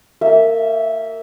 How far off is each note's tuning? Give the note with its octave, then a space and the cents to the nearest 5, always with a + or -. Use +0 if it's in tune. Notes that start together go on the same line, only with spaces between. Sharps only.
A#3 -30 E5 -5